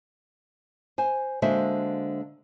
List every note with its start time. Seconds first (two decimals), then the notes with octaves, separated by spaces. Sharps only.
0.98 C5 G#5
1.42 D3 G#3 A#3 F#4 C5 E5